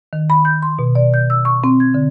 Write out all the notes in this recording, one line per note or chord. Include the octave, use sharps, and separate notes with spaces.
D#3
B5
G6
C6
B2
D5
G6
E6
C#6
C4
G#6
D3